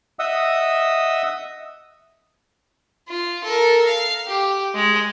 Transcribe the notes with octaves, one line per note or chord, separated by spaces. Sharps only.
D#5 E5 F#5 D#6 E6
F4
A4 A#4
F5
G4
G#3